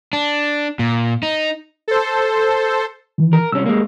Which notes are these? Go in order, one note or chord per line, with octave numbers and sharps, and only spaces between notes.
D4
A#2
D#4
A4 C5
D#3 E3
A#4
C2 C#4 E6
G#3 A#3